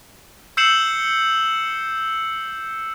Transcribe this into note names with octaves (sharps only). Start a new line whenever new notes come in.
E6 G6 C7 C#7 E7 F#7